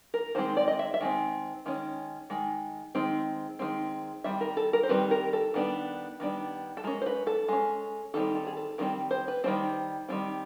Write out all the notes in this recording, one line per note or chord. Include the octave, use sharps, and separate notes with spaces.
A#4
D#3 G#3 C4 C5
D5
D#5
E5
E5
D#3 G#3 C4
D#3 G#3 C#4
D#3 G#3
D#3 G#3 C4
D#3 G#3 C4
D#3 G3 C4 E5
A#4
A4
A#4
C5
D#3 G3 C4 B4
A#4
A4
D#3 G3 B3 D4
D#3 G3 B3 D4
A4
G#3 C#4 A#4
C5
B4
A4
G#3 C#4
D#3 G3 C4 D#4 A4
A4
G#4
A4
D#3 G3 C4 D#4 A#4
C5
B4
D#3 G3 C4 C5
D#3 G3 C4